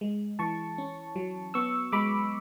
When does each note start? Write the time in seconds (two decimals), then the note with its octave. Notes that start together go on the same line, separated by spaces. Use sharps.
0.01 G#3
0.39 E3 A5 C#6
0.78 C#4
1.16 F#3
1.54 B3 C#6 E6
1.92 G#3 B5 D6